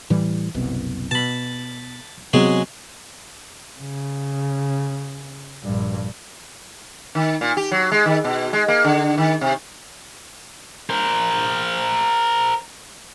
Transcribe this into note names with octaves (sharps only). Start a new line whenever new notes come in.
A2 E3 G3
F#1 C2 B2
B2 A5 B5
C3 F#3 G#3 B3 C4 G#4
C#3
A#1 G2
D#3
A#2
G4
F#3
G#3
D#3
B2
G#3
A#3
D3
D#3
C3
A#4 C5